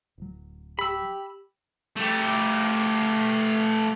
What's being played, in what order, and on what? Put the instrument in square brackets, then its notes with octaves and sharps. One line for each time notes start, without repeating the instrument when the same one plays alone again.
[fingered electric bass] D1 F#3
[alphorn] G4 [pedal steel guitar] B5 E6
[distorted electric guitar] A3 G4